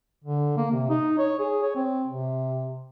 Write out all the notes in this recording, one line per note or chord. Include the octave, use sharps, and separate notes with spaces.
D3
A#3
C3
D#4
C#5
G#4
C#5
C4
C3